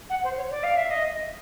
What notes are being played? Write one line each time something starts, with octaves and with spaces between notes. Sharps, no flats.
F#5
C5
C#5
D5
F5
E5
D#5